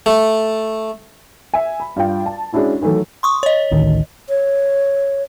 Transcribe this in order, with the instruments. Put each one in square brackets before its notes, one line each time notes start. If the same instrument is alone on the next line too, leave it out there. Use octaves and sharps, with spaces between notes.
[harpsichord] A3
[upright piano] E5 G#5
B5
G2 F4 G5
A5
G#3 C#4 D4 E4 F#4
D#3 E3 F#3 A3
[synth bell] C6 C#6 D#6
C#5 D#5
[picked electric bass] A1 D2 D#3
[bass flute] C#5